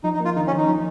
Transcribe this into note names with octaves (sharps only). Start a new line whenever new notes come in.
F3 D#4
D#4
A#3 F4
D#3 D#4
C#4
D#3
D#4
F3